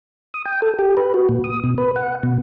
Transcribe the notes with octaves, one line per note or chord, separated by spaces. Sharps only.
D#6
G5
A4
G4
B4
F#4
A#2
D#6
B2
B4
F#5
B2